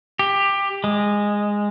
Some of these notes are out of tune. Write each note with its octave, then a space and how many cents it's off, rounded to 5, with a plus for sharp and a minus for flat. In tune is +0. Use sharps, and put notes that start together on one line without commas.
G4 +15
G#3 -10